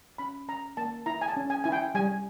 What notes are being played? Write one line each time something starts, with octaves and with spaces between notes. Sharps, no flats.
C#4 B5
C#4 A#5
A#3 A5
E4 A#5
G#5
A5
C#4
G#5
E4 G#5
G5
G3 G#5